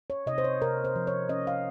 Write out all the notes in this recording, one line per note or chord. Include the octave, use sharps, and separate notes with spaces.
C#5
C3 D#5
C5
C#5
C3 A#4
C5
F3
C#5
C#4 D#5
F5